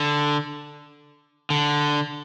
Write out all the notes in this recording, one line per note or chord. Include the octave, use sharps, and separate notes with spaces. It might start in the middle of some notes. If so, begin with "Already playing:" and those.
Already playing: D3
D3